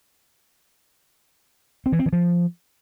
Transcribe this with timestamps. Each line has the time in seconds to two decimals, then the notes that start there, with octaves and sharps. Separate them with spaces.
1.86 C4
1.93 E3
1.99 C4
2.06 E3
2.13 F3